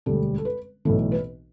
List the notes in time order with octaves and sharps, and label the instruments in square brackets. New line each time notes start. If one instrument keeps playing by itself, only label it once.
[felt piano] E1 D2 D3 G3 A4
A4
B4
B1 A2 E3 A4
B4